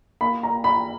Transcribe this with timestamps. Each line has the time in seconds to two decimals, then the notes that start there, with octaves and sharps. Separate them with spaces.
0.21 A#3 B5
0.43 A#5
0.50 A#3
0.64 B5